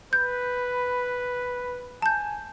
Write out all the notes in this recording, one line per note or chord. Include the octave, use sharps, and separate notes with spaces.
B4 G6
G#5 A5 G6